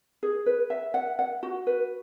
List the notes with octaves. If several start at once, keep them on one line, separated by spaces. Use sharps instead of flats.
G#4
B4
E5
F#5
F#5
F#4
B4